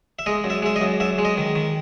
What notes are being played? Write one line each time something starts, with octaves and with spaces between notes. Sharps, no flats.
E5
G#3 D#5
F#2
E5
G#3 E5
D#5
F#2
F#2 E5
G#3
D#5
D#3
D#3